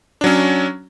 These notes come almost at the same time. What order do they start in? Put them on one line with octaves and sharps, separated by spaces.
D4 F#3 C#4